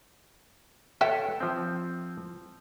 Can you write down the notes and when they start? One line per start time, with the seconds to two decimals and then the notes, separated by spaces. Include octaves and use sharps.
1.01 A4 B4 C#5 E5 G5
1.40 F3 C4